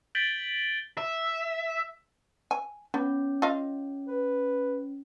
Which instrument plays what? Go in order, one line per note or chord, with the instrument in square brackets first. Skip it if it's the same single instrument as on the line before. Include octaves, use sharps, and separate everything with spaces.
[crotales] G6 A6 B6 D7 F#7 G7
[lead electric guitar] E5
[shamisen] G#5
[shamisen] B3 [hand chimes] C#4
[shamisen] F4 D#5 F5
[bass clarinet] B4